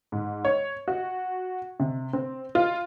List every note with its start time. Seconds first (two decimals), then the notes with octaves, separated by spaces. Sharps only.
0.12 G#2
0.45 C#5
0.88 F#4
1.80 C3
2.13 C4
2.55 F4